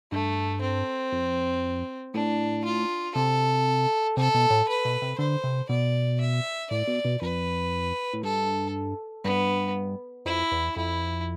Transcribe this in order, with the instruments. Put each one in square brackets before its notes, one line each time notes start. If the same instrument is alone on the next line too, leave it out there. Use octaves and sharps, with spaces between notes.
[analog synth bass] G2 [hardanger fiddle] A3
[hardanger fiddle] C4
[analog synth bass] F2
[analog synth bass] A2 [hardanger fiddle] D4
[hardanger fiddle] F4
[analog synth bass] C3 [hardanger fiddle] A4
[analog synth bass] C3 [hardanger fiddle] A4
[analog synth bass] B2
A2
[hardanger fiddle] B4
[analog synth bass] B2
C3
[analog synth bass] D3 [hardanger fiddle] C5
[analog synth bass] C3
[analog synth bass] B2 [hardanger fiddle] D5
[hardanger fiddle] E5
[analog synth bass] A2 [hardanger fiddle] D5
[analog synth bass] B2
B2
[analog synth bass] F2 [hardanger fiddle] B4
[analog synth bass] A2
[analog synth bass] G2 [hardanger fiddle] A4
[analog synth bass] G2 [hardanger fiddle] B3
[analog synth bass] F2 [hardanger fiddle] E4
[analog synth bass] E2
[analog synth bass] F2 [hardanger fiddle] E4